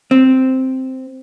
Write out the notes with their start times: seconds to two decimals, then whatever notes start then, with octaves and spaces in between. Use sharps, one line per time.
0.11 C4